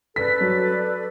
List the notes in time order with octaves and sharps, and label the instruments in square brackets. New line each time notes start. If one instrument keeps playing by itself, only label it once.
[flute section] A4 B4 D5 [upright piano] B6
[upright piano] F#3